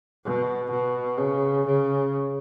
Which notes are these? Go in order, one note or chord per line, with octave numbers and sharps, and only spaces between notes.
B2
B2
C#3
C#3